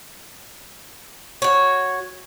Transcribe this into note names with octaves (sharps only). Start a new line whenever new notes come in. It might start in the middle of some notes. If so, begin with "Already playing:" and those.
F#4 C#5